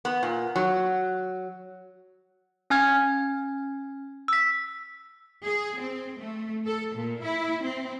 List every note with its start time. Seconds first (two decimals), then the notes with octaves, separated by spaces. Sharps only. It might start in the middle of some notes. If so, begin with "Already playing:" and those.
0.05 B3
0.23 A#2
0.56 F#3
2.70 C#4 G#5 F6 G#6
4.28 E6 B6
5.46 G#4
5.80 C4
6.19 A3
6.66 A4
6.95 A#2
7.24 E4
7.63 C4